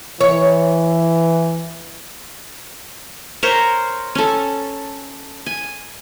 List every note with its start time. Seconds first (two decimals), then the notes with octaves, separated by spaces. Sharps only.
0.21 E3 C#5
3.43 A#4 C5 C#5 A#5
4.15 C#4 A4
5.46 G#5